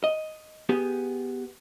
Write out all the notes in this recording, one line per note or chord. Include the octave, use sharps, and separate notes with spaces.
D#5
B3 G4 G#4